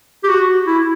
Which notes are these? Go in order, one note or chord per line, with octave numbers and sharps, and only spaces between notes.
G4
F#4
E4